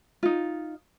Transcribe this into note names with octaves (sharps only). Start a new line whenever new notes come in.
D#4 F4